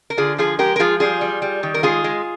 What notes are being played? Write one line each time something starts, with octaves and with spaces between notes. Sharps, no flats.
A#4
D3 F4 G#4
F3 F4 G#4
G#3 G4 A#4
A#4
F3 F4 G#4
G3 F4 G#4
G3
G3
D#3
A#4
G#3 F4 G#4
G#3